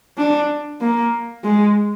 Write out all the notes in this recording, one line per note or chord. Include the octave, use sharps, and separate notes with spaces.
D4
A#3
G#3